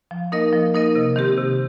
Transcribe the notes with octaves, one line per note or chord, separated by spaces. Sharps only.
F3
A#3 D#4 A#4 D#5
F3
A#3 D#4 A#4 D#5
C3
D#3 C4 G4
C3